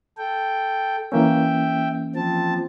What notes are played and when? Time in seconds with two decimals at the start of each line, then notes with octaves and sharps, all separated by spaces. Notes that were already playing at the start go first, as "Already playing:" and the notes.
0.17 A4 G5
1.12 E3 A#3 C#4 E5 G5
2.16 F3 C4 A5